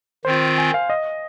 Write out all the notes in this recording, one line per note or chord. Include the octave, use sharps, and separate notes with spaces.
D#3 C4 F4 C5
G#5
F5
D#5